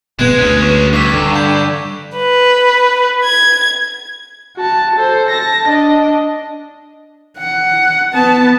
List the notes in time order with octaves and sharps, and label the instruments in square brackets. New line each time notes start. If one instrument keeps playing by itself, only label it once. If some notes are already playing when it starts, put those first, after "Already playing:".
[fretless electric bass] G1 B2 B3 [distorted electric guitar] G#3 [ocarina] B4 [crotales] F#6 G#6 E7
[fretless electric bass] D2 [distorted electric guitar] G#3 C#4
[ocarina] B4 [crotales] C#6
[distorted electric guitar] G2 [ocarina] C#6 [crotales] D6 E6 B6
[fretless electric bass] D3 [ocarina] A#5
[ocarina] D5 [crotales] G6
[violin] B4
G#6
[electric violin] F#4 A5
A4 C5
A5 A#6
D4 D#5
[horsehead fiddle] F#5
B3 A5